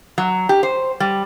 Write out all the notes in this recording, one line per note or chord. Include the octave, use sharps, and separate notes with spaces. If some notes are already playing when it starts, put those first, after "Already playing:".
F#3
G4
C5
G3